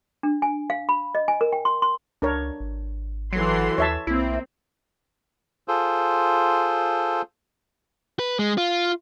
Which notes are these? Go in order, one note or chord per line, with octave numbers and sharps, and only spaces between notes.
D4
G#5
F5
B5
D#5
G#5
A#4
G5
C6
C6
C#2 D4 A#4 C#5
G#1
E3 F#3 A4 C6
D#2 C#5 E5 A5
B1 A#3 C4 E4
F4 G#4 A4 C5
B4
G#3
F4